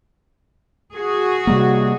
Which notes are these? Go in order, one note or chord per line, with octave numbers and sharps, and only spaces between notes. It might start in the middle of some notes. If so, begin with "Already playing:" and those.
F#4 G#4
C3 G3 A#3